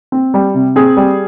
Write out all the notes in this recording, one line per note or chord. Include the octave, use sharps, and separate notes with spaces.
C4
G3
C3
C4 G#4
G3